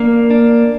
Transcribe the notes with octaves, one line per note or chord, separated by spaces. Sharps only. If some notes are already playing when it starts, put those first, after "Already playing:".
Already playing: A#3 D4
D4